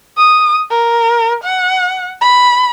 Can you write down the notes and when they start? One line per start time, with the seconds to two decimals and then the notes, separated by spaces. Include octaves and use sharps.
0.17 D#6
0.71 A#4
1.44 F#5
2.21 B5